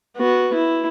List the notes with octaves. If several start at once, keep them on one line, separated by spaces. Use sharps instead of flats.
B3 F#4
E4